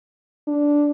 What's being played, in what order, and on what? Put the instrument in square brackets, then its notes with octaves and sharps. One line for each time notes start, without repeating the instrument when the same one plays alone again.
[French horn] D4